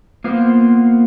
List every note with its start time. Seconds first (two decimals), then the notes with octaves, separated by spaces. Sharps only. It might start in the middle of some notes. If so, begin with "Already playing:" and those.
0.24 A#3 B3 F4 C5